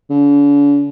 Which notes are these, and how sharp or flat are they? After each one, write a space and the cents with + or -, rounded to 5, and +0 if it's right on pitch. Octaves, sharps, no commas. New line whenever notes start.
D3 -45